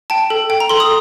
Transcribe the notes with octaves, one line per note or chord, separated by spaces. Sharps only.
G5 A5
A4
G5
A#5
A4 C6
D#6